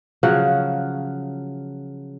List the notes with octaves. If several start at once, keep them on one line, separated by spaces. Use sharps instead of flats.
C#3 F3 F#3 F#5